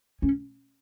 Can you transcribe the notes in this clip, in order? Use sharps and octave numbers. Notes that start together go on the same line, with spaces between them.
C#4